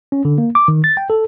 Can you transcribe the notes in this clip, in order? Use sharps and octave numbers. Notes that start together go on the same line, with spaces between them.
C#4
D3
A#3
D6
D#3
A6
G5
A4